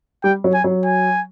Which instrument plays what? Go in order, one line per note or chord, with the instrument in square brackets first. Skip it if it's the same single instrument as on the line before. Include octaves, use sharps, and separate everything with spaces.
[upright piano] G3 [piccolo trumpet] G5
[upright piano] F#3
[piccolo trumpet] G#5
[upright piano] F#3
[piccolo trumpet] G#5